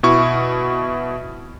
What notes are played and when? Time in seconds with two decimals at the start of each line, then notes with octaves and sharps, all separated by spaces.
0.03 B2 E4 C#6